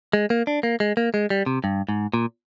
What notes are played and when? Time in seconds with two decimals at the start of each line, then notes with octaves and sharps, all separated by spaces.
0.13 G#3
0.30 A#3
0.47 D4
0.63 A#3
0.80 G#3
0.97 A#3
1.14 G#3
1.30 G3
1.46 C3
1.64 G2
1.89 G#2
2.14 A#2